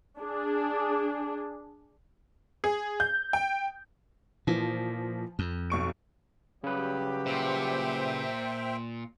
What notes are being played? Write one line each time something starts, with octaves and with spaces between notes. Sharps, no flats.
D4 G#4
G#4
G6
G5
A#2 E3 F3
F2
B1 C#6 D7
C#3 F#3 G3 G4 B4
A#2 C5 E5 G5